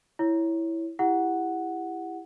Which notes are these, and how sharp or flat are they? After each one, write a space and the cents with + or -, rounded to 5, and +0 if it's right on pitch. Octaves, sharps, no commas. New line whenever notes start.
E4 +0 C#5 +0
E4 +10 G4 +25 F#5 +0